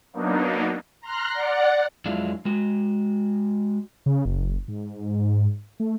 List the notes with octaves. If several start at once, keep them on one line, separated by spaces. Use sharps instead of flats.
F#3 A#3 B3 D4 D#4
A#5 C6 F6 F#6
D5 F#5
F2 F#3 G#3 D4 E4 F4
G#3 F#4
C#3
F#1
G#2
A3